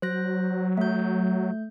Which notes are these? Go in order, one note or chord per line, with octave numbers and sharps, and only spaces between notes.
F#3 C5 F#6 A#6
A3 G6